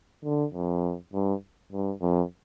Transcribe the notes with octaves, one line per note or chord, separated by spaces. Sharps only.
D3
F2
G2
G2
F2